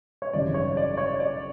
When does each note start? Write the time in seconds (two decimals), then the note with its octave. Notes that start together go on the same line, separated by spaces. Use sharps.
0.22 C#5
0.33 G#1 F#2 C#3 E3 G3 D5
0.54 C#5
0.77 D5
0.97 C#5
1.20 D5